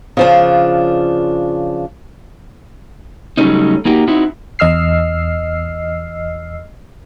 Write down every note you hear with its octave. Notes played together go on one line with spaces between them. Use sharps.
C#3 F3 D4
C#3 F#3 G3 A3 C#4 D#4
A#3 D#4 F#4 G4
C4 D#4 E4 F#4
E2 D#5 E6 F6 C7